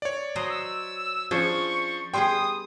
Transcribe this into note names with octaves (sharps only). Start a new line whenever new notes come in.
C#5 D5
F#3 C5 D#5 D#6
E6
F3 C#4 D4 G#4 C#6
G3 B3 G#4 G5 C6 D#6